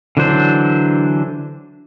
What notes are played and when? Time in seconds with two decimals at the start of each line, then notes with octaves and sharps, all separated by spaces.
0.17 D3 E3 F#3 D4 C5